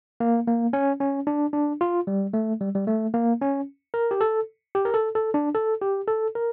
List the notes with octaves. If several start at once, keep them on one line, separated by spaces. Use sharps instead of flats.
A#3
A#3
C#4
C#4
D4
D4
F4
G3
A3
G3
G3
A3
A#3
C#4
A#4
G4
A4
G4
A#4
A4
A4
D4
A4
G4
A4
A#4